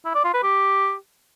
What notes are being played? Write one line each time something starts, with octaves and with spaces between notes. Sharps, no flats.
E4
D5
F4
B4
G4